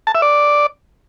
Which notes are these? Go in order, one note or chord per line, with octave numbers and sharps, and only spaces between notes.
A5
E5
D5